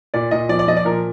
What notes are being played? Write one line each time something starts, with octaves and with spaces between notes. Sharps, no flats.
A#2 D5
A#2 D#5
F3 D5
D5
F3 D#5
D5
A#2 A#4